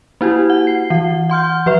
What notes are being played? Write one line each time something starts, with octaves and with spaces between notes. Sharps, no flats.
A#3 E4 F#4 G4
F#5
C7
E3 F#5
F#5 C6 F6 G6
F3 B4 E5